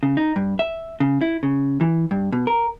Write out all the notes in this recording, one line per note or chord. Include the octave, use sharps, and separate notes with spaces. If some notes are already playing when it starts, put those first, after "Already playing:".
C#3
D#4
G2
E5
C#3
E4
C#3
E3
G2
B2
A#4